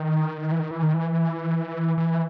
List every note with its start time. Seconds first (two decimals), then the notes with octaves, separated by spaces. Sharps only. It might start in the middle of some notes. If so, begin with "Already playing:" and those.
Already playing: D#3
0.52 E3
0.59 D#3
0.71 E3
0.83 D#3
0.94 E3
1.98 E3